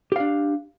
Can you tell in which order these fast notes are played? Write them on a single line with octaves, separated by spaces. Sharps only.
G4 F5 D4